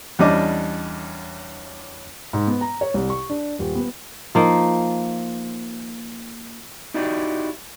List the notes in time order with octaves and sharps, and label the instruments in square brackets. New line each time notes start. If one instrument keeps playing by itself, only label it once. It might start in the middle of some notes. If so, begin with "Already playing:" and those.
[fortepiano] E2 G3 C#4 D4 D#5 D6
[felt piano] G#2
B3
A#5
C#5
C2
C#6
D4
D#1
B3
[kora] F3 A#3 D#4
[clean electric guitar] D#4 E4 F#4 G4 D5 D#5